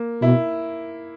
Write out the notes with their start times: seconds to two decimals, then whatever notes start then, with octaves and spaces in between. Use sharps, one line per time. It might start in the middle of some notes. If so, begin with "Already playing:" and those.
Already playing: A#3
0.22 B2 E4